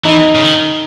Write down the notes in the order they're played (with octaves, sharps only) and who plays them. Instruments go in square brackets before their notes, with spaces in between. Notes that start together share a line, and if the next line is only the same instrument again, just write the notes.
[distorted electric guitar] E3 [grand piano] D#4
[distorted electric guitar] C#3
D#3